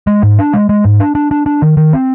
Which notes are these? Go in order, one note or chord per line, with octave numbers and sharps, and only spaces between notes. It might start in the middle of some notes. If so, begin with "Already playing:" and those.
G#3
G#2
D4
G#3
G#3
G#2
D4
D4
D4
D4
D#3
D#3
C4